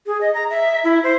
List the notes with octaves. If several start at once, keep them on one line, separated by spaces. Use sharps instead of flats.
G#4
D#5
A#5
E5
E4
C5